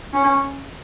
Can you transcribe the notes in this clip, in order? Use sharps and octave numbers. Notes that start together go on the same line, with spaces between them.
C#4